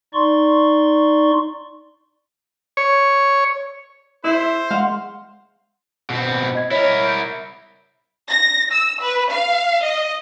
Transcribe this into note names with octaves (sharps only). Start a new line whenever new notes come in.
D#4 D5 C6 C#6
C#5
E4 C5 E5
G#3 F5 F#5 C6
B2 C4
D#5 G#6
E4 A#4 C#5
G6 D7
A#6
E6
B4
F5
D#5